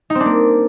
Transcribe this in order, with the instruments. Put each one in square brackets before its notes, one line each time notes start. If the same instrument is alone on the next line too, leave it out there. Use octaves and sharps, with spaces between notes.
[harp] D#4
C4
D4
A#3